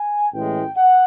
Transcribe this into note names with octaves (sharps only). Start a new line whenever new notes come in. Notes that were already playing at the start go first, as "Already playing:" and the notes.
Already playing: G#5
A1 A2 E3 G#3 G5
F#5